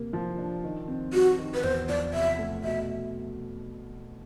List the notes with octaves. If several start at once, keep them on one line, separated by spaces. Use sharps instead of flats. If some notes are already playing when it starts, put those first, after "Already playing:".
Already playing: C3 A#3
F3
D4
D#3
C4
G3 F#4
D#3
B4
E2 C5
F3 D5
C3 E5
A3
B2 E5